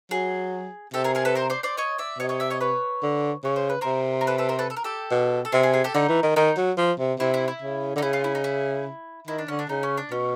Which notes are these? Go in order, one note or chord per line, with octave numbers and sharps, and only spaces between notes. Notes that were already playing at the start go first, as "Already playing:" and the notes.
F#3 G#4
C3 G4 A4
G#4 A#4
G#4 A#4
A4 B4
A#4 C5
C5 D5
C5 D5
C#5 D#5
D5 E5
C3 C#5 D#5
C#5 D#5
D5 E5
C#5 D#5
B4 C#5
D3
C#3 C#5
C5
B4
C3 A#4 C5
A#4
A4 B4
A4 B4
A#4 C5
A4 B4
A4
A#4
G4 A4
B2
A4
C3 G#4
G#4
G#4
G4 A4
D3 D#4
E3
D#3
D#3 D#4
F#3
F3
C3
C3 E4
E4
E4
C#3
D3 D#4
C#3 E4
F4
E4
D#4
E4
D#3 E4
D4
D3 C#4
D4
C#3 D#4
C#4
D4
B2 C#4